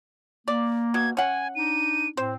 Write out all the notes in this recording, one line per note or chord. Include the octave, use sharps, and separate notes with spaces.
A#3 D5
B2 G#6
C#4 F#5 G#5
D4 D#4 D#7
A2 C4 C5